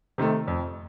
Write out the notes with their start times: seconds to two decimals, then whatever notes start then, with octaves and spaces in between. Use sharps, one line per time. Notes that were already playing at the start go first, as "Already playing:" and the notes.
0.18 C3 D#3 A3
0.48 F2